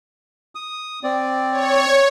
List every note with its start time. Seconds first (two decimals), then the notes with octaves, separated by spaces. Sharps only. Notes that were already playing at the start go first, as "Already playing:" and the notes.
0.55 D#6
1.04 C4 D5
1.51 C#5